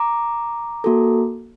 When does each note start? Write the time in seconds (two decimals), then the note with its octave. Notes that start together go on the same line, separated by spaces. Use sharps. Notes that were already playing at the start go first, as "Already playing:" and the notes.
Already playing: A#5 D6
0.84 A#3 F#4 A4